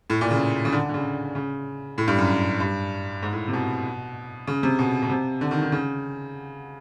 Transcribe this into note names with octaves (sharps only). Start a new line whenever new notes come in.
A2
A#2
C#3
C#3
D3
D3
C#3
C#3
A2
G2
F#2
G2
G#2
A2
C3
B2
C#3
C3
B2
B2
C3
D3
D#3
D#3
C#3